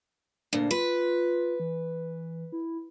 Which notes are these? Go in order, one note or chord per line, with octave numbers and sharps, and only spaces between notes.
D2 A#2 D4
F4 B4
E3
E4